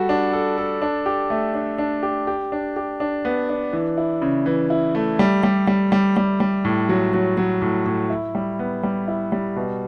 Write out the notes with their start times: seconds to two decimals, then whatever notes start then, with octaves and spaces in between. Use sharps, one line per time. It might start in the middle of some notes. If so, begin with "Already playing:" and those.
Already playing: G3 F#4 A4
0.09 D4
0.33 A4
0.58 A4
0.82 D4
1.06 G4
1.30 A3
1.54 D4
1.78 D4
2.03 G4
2.27 G4
2.52 D4
2.76 G4
3.00 D4
3.25 B3
3.49 D4
3.73 E3
3.97 E4
4.22 C#3
4.46 E3
4.70 E4
4.95 A3
5.19 G3
5.43 G3
5.67 G3
5.92 G3
6.17 G3
6.40 G3
6.65 A2
6.89 F#3
7.14 F#3
7.37 F#3
7.62 A2
7.86 A2
8.10 E4
8.35 G3
8.59 B3
8.83 G3
9.08 E4
9.32 G3
9.56 B2